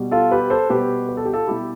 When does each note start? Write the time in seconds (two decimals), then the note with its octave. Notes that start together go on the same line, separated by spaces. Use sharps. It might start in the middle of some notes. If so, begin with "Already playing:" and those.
Already playing: B2 G3
0.11 F4 A4
0.31 G4 B4
0.50 A4 C5
0.70 B2 G3 G4 B4
1.09 B4
1.17 A4
1.25 G4
1.33 F4 A4
1.47 B2 G3 E4 G4